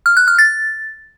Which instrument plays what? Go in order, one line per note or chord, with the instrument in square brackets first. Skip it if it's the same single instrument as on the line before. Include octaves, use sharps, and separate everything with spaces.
[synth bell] F6
F#6
F6
A6